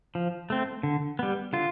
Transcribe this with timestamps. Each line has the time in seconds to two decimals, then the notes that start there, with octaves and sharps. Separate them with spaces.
0.15 F3
0.50 A3 C4
0.83 D3
1.19 G3 B3
1.53 D3 F4